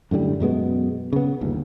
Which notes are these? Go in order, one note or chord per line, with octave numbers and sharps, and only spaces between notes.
F#2 A2 D3 G3
F#2 B2 G#3 B3
C#3 B3
G1 D#2